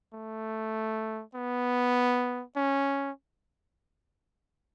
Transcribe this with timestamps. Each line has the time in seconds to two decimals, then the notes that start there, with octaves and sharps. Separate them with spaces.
0.14 A3
1.35 B3
2.56 C#4